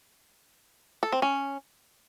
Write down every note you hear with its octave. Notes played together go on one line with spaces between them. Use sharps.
A4
C4
C#4